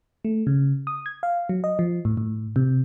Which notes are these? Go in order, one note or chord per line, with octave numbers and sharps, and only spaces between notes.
A3
C#3
D#6
G#6
F5
F#3
D#5
F3
A2
A2
C3